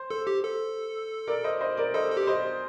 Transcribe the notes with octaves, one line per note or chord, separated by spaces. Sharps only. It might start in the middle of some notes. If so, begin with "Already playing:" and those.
Already playing: C5
A4
G4
A4
A#4 D5
C5 D#5
C5 D#5
A#4 D5
A4 C5 D#5
A4
G4
C5 D#5